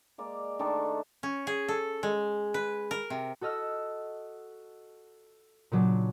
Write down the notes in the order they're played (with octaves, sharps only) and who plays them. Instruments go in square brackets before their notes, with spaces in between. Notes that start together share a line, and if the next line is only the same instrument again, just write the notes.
[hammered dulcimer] G#3 A#3 D5
D#3 A3 D4 A5
[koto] C#4
G#4
A4
G#3
B4
A#4
C3
[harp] F#4 A4 D#5 E6 F6
A#2 C#3 F#3 D4